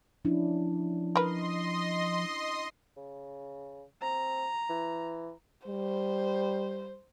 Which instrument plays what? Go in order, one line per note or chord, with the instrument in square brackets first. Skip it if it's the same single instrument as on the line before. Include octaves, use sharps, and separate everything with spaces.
[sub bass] F3 [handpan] C#4 D4 E4
[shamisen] A#4 B4 [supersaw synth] D#5 C6
[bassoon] C#3
[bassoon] C4 [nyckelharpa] A#5
[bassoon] E3
[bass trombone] G3 [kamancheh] C5